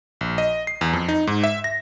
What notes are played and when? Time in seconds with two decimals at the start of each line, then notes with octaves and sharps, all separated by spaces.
0.21 A#1
0.38 D#5
0.67 C7
0.81 E2
0.93 F2
1.09 D#4
1.27 G#2
1.44 E5
1.64 A#6